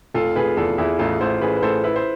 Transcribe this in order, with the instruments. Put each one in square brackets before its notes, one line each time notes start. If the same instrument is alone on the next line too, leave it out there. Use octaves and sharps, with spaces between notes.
[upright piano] F1 [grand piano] F4 A4
[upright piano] F1 [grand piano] G#4 B4
[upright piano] E2 [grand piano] F4 A4
[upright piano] E2 [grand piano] E4 G#4
[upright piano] A1 [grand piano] F4 A4
[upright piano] A1 [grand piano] A4 C5
[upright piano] A1 [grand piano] G#4 B4
[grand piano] B4
[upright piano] A1 [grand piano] A4 C5
[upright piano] E4 [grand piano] B4
[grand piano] C5